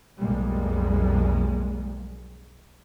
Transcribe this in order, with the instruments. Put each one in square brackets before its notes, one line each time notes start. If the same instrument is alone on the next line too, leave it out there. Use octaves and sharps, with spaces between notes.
[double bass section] B1 F2 G#2 G3 G#3 A#3